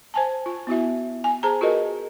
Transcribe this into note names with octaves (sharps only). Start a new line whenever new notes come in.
C5 G#5 A5
F4
B3 E4 F#4 E5
G#5
G#4 C5 A5 A#5
F4 F#4 G#4 A#4 B4 D#5